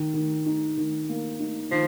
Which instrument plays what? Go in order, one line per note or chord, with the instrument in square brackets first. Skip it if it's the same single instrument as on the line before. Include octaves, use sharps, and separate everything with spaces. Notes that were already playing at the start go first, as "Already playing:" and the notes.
Already playing: [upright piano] D#3
D#3
D#4
D#3
A#3
D#4
[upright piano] D#3 [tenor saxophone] F3